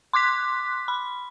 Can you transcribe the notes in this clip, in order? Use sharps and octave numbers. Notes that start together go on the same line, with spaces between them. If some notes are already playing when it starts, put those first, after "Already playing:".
C6 D6 F#6 B6
B5